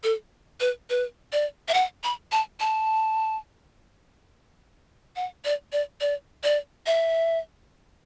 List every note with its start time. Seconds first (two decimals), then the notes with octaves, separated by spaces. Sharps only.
0.04 A4
0.60 B4
0.90 B4
1.32 D5
1.68 E5
1.74 F#5
2.04 B5
2.32 A5
2.60 A5
5.16 F#5
5.45 D5
5.72 D5
6.01 D5
6.44 D5
6.86 E5